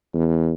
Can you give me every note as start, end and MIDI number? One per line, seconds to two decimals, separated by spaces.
0.14 0.54 40